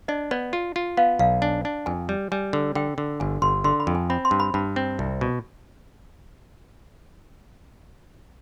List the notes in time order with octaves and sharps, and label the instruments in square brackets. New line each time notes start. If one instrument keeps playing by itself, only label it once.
[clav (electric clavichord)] D4 [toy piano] D#5
[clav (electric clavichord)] B3 [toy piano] D5
[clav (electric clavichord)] F4
F4
[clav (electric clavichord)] B3 [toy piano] F5
[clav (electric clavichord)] B1 [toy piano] F5
[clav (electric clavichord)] D4 [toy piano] G#5
[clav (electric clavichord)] D4
[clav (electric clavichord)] F2 [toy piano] G#5
[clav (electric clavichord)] G3
[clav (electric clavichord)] G3 [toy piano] G#5
[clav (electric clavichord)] D3
[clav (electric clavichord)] D3 [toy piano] G5
[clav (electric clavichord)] D3
[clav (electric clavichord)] G1 [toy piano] G#5
[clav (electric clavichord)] G1 [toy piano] C6
[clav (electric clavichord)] D3 [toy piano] C6
[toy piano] B5
[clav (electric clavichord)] F2
[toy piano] G#5
[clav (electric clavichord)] C4 [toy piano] B5
[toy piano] C6
[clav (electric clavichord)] G2
[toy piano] B5
[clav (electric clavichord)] G2 [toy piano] B5
[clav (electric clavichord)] C4
C2
B2